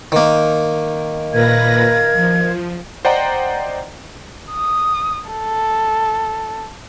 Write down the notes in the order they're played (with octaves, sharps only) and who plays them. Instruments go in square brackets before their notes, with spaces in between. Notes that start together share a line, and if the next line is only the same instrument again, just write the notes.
[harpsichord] D#3 A#3
[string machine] A#2 B4 A#6 [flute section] A#4 F5 G#6
[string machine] F3
[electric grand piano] C5 D5 D#5 F#5 G5 A#5
[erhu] D#6
A4